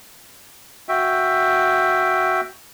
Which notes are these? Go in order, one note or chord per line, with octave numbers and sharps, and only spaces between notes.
F#4 E5 G5